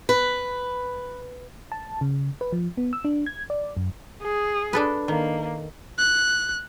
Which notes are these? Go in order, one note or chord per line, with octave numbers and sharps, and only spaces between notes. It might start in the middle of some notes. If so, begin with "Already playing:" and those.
B4
A5
C#3
B4
F3
B3
E6
D4
G#6
D5
F#2
G#4
D4 A4 B4
D#3 A#3
F#6